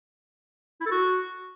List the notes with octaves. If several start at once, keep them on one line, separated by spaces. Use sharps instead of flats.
E4
A4
F#4